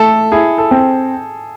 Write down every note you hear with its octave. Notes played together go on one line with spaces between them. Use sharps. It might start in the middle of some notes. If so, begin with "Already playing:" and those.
Already playing: A3 A4
E4 G#4
A4
C4